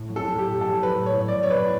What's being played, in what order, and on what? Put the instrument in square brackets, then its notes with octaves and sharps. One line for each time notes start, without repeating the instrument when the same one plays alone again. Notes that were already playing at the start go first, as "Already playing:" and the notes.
Already playing: [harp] A2
F#3
[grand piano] A4
[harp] B3
[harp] A2 [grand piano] G4
[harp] A2
[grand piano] A4
[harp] F#3
[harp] B3 [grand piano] B4
[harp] A2
[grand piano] C#5
[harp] A2
[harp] F#3 [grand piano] D5
[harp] B3 [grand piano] C#5
[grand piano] B4
[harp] A2